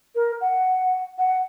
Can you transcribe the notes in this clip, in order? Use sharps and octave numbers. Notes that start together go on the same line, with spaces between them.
A#4
F#5
F#5